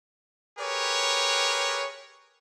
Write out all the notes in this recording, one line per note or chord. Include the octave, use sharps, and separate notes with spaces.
G4 G#4 A#4 B4 C#5